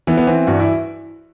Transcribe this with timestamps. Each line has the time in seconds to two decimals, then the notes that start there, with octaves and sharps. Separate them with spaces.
0.07 E3 B3
0.17 B3
0.27 E3 C4
0.47 G2 F#4
0.60 E4